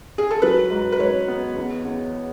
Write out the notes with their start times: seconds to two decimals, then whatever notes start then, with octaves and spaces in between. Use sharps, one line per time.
0.18 G#4
0.31 A4
0.42 F#3 B4
0.71 G#2
0.92 B4
0.99 G#2 C#5
1.28 B3
1.56 E2
1.85 E2